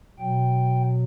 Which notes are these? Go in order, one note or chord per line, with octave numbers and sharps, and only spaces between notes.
B2 F#3 G5